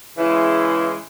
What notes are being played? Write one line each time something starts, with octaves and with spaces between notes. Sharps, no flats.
C#3 E3 G#3 E4